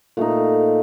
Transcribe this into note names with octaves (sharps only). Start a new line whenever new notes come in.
A#2 A3 D#4